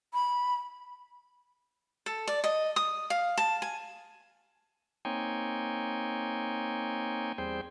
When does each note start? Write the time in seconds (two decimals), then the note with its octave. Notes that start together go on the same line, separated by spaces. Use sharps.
0.14 B5
2.06 A4
2.28 D5
2.44 D#5
2.76 D#6
3.10 F5
3.38 A5
3.62 G#5
5.05 A#3 C4 D#4 C#5 G5 G#5
7.38 E2 G3 C4 G#4 C5 G5